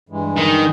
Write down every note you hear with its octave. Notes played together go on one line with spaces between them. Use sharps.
G2 E3 G#3
D#3